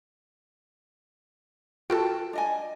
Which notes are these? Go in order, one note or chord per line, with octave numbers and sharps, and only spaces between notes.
F4 F#4 A4 G5 A5
D4 D#5 G#5